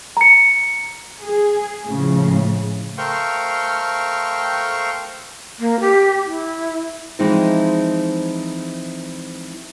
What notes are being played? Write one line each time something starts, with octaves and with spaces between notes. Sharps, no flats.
A#5 C#7
G#4
A2 C#3 F3
A3 A#4 C5 F5 G5 C#6
A#3
G4
E4
E3 F3 G#3 C4 D#4 E4